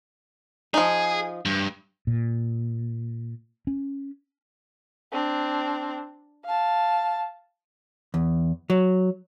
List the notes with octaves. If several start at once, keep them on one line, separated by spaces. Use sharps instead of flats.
F3 D#4 G#4
G2
A#2
C#4
C4 D4
F5 A5
E2
F#3